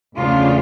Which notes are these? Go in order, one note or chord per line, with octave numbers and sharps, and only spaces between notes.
E2 C#3 F3 A3 D4 F4